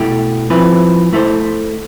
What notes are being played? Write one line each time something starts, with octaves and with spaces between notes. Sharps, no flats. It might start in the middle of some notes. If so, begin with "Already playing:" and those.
Already playing: B2 A3 E4 G4
F3 C4 E4 B4
A3 E4 A4 C5